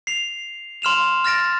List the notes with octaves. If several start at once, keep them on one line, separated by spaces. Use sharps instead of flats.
C7 F7
C6 F6 E7 F7
F6 A6 A#6 D7